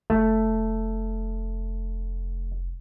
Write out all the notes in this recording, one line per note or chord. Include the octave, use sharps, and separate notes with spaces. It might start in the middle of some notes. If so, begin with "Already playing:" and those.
F1 A3